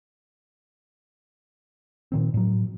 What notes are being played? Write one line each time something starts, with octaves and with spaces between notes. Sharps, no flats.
A#2 D#3 C4
A2 F#3